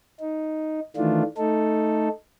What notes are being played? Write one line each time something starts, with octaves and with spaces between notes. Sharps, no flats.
D#4
D#3 E3 A3 D4 F4
A3 D#4 A4